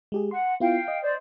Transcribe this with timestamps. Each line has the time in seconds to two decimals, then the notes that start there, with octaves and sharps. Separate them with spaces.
0.12 G#3 G4 G#4
0.31 F#5 C6
0.60 B3 E4 F4 F5 G5
0.88 D#5
1.02 C5 D5